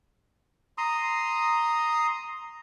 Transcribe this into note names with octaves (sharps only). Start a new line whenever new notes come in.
A#5 C6 D#6